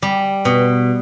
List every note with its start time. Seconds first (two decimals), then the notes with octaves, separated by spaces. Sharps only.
0.02 G3
0.45 B2